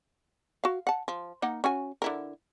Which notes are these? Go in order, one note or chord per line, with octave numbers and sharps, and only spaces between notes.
F#4 F5
F#5 A5
F3
A#3 D#4 F#5
C#4 F#4 G#5
D3 E4 A#4